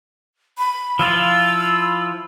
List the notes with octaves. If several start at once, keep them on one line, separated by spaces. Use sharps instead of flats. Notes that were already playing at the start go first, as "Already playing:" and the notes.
B5
F3 E4 F4 E6